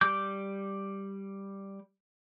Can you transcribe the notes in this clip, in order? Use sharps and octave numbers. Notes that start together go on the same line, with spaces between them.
G3 D6 G6